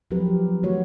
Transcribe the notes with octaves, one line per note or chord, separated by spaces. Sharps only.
F3 F#3 C4 G4 A#4 B4
D#3 A3 F#4 C#5